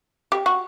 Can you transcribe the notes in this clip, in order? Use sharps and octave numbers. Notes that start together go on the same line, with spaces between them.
G4
F#4